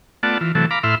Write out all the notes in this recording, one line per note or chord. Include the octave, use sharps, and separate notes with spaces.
A3 B3 F4 D5 F#5 A5
E3 F4
C3 E3 F#3 A3 A4
F5 A#5 B5 D6
A2 E4 E5 B5 C6 F6